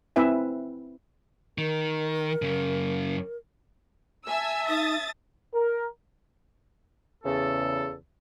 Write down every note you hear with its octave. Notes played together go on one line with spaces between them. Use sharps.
C4 E4 B4 E5 G#5
D#3 A#4
F#2 C#3
E5 G#5 A5 E6
D#4 D#6 A6
A#4
E2 C#3 A4